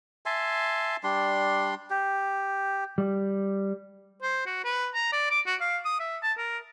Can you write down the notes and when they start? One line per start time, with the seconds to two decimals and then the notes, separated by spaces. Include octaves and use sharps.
0.26 E5 G#5 A5 C6
1.04 G3 D4 C6
1.90 G4
2.98 G3
4.22 C5
4.46 F#4
4.64 B4
4.94 A#5
5.12 D5
5.31 D6
5.46 F#4
5.61 F5
5.85 D#6
6.00 E5
6.23 A5
6.38 A#4